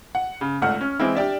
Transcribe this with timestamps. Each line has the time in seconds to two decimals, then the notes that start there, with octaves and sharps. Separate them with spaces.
0.15 F#5
0.41 C#3
0.62 G#1 C#2 A3 F#5 F6
0.81 C#4
1.00 E3 G#3 C4 E4
1.15 D4 G4 D5 E5